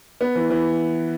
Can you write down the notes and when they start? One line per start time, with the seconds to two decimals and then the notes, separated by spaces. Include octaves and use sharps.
0.21 B3
0.35 E3
0.50 E3